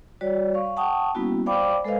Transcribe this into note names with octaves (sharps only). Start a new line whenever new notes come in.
G3 F#4 C#5 D5
F5 C#6
F#5 G5 A5 C#6 D#6
G3 A#3 B3 C#4 E4 F#4
C5 D5 F5 G5 B5 D6
G#3 A4 B4 C5 D#5 F5